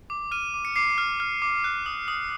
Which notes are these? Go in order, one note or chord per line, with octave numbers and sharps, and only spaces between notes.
D6
F6 D#7
D6
C#7
D6 C7
F6
F6
D6
F#6
D#6
D#6